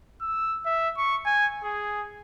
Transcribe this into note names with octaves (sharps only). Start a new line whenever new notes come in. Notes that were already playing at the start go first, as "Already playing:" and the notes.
E6
E5
C#6
G#5
G#4